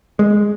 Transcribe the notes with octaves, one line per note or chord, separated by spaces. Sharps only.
G#3